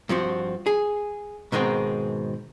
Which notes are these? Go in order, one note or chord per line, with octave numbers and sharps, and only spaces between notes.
G2 F3 C4 F#4
G#4
G#2 B2 D#3 G#3 C4